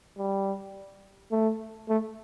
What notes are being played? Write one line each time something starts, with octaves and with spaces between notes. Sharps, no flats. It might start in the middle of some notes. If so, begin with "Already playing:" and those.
G3
A3
A3